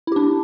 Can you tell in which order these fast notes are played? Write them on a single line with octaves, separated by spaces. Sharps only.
E4 G4 D4